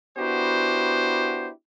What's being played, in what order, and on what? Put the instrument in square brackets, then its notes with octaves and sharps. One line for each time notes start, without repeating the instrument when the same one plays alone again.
[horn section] B3 D4 E4 F#4 G4 C5